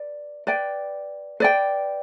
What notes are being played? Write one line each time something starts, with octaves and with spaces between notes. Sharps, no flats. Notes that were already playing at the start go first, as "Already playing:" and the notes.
Already playing: B4 D5
B4 D5 G5
B4 D5 G5